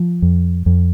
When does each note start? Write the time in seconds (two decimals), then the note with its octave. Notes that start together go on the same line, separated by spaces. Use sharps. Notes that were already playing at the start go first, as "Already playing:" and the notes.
Already playing: F3
0.22 F2
0.66 F2